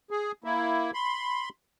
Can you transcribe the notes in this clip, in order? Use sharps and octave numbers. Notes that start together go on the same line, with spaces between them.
G#4
A#3 E4
B5 C6